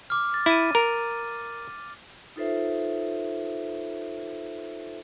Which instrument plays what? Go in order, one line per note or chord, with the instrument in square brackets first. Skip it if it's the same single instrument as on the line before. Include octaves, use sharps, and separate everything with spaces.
[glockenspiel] D6 F6
A6
[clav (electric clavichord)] E4 [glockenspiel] A6 D#7
[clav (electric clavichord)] A#4
[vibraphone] D#4 F4 A4 B4 C5 E5